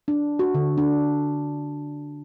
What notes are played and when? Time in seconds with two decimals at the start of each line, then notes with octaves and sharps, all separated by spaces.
0.08 D4
0.39 F#4
0.54 D3
0.78 D4